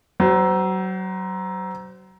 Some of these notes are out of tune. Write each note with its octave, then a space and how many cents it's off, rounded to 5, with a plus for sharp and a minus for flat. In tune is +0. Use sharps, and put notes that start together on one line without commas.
F#3 +25 C5 -25